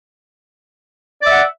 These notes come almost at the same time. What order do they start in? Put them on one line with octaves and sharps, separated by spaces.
D5 E5 F#5